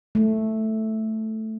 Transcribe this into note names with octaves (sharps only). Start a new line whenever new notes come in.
A3